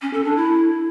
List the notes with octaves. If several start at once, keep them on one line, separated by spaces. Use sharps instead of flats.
C#4
A4
D4
E4